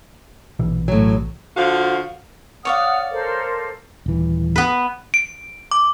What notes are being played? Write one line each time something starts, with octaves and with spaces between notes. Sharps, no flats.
A#1 B2 E3
A2 F#3
D3 F3 F#4 F5
C#5 D5 F5 F#5 D#6 F6
A4 A#4 C5
D#1 E3
B3 B4
D7
D6